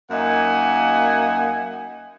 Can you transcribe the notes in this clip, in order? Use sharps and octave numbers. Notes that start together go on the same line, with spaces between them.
F#2 A#3 D#4 E5 F#5 G#5